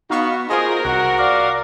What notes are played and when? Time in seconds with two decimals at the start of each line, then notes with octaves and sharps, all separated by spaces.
0.10 B3 D#4 F#4 F5 C#6
0.49 F4 G#4 A#4 C5 D#5
0.85 C2 F#4 F#5
1.19 D5 F5